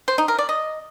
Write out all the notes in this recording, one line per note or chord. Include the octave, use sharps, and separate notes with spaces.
C5
D#4
A#4
D5
D#5